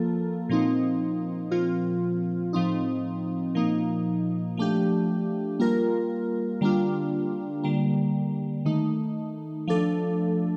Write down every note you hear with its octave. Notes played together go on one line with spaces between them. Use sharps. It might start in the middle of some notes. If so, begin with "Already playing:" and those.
Already playing: F3 A#3 F4 A4
A#2 F3 C4 D#4
A#2 F3 C4 F4
A2 F3 C4 D#4
A#2 F3 A#3 D#4
F3 A3 D4 G4
G3 A#3 F4 A#4
D3 G3 A#3 D4 F4
D3 G3 A#3
D#3 A3 D#4
F3 A3 D4 A4